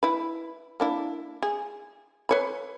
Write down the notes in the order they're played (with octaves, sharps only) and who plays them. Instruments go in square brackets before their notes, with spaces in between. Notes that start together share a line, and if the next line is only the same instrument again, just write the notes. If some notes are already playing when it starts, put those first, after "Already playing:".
[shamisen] E4 B4
A#3 D4 E4
G#4
B4 C#5 B5